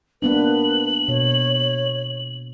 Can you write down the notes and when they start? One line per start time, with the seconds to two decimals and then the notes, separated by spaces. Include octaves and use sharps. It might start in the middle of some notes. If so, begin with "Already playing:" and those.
0.22 A#3 B3 D4 B4 F#7
1.08 B2 C#5